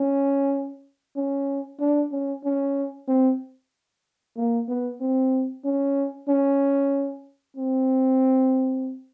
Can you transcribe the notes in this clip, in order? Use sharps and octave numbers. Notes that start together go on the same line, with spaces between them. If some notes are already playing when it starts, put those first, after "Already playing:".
Already playing: C#4
C#4
D4
C#4
C#4
C4
A#3
B3
C4
C#4
C#4
C4